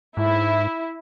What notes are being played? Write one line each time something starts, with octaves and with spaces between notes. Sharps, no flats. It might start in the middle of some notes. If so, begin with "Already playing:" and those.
G#2 E4